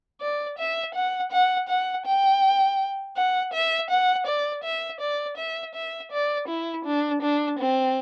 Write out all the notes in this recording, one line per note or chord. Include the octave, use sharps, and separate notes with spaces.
D5
E5
F#5
F#5
F#5
G5
F#5
E5
F#5
D5
E5
D5
E5
E5
D5
E4
D4
D4
C4